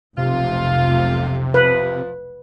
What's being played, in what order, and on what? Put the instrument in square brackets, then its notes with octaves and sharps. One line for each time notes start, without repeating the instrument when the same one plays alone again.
[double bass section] F1 B1 F2 [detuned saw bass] C3 [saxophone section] F4
[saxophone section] F3 [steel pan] B4